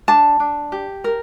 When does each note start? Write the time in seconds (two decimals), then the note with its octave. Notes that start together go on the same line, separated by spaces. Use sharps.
0.08 D4 A5
0.40 D4
0.72 G4
1.04 A#4